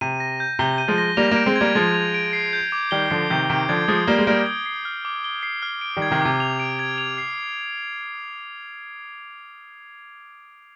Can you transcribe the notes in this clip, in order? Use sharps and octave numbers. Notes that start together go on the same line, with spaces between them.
C3 D#7
A#6
G6
C3 G7
D#7
F3 G#3
A#6
G3 A#3 F7
G3 A#3 D7
G#3 C4
G#6
G3 A#3
F3 G#3 G#6
F7
D7
C7
G6
D6
D#3 G3 G7
D3 F3 C7
C3 D#3 G6
C3 D#3 D7
D3 F3 G#6
F3 G#3 D#6
G3 A#3 G7
G#3
G3 A#3 D7
G#6
C7
F6
D6
G7
C7
F6
D7
D#3 G3
G#6
C3 D#3
C3 D6
F7
D7
G#6
F7
C7